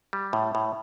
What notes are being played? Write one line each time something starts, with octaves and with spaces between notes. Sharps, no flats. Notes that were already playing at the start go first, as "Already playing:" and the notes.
G3
A2
A2